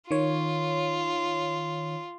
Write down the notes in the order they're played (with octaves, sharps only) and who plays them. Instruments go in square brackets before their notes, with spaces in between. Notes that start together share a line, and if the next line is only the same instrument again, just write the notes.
[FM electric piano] D#3 C#5 [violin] F4